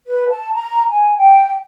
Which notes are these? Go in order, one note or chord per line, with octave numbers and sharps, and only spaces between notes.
B4
A5
A#5
G#5
G5